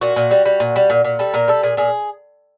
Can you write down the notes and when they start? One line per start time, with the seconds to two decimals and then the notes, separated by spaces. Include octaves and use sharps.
0.01 A#2 F#4
0.16 A#2
0.31 G3
0.46 G3
0.60 A#2
0.76 G3
0.90 A#2
1.05 A#2
1.19 G3 A4
1.33 A#2 A#4
1.48 G3 A4
1.63 A#2 G#4
1.77 A#2 G#4